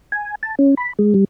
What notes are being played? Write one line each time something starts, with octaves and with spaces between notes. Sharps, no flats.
G#5
A5
C#4
B5
G#3
G3